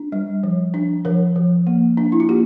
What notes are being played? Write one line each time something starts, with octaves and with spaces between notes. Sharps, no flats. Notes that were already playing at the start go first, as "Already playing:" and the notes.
Already playing: D4
G3
F3
D4
F3 A#4
F3
A#3
D4
E4
F4
A#3 G4